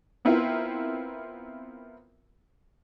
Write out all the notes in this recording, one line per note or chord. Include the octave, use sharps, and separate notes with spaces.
B3 C4 E4 F4 A#4